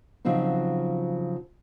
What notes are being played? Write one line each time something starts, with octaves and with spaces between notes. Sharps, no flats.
C#3 F3 F#3 C4 D#4